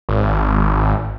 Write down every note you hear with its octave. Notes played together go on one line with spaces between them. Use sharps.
G#1